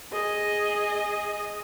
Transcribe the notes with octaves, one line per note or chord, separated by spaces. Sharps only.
G#4 D#5